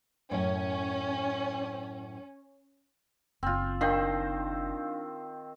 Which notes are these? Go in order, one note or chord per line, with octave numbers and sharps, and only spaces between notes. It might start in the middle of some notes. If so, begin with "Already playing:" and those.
F#2 A2 C#4
F#1 C4 F4
D#3 C4 D4 C5 F5